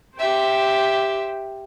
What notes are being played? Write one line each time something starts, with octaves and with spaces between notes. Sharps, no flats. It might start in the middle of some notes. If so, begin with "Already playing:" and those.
G4 C5 E5 G5